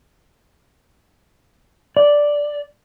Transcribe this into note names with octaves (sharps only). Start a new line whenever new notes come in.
D5